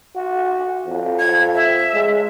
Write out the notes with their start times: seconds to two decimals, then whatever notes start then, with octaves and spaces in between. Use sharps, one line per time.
0.16 F#4
0.86 F2
1.19 G#6
1.55 E5
1.94 G#3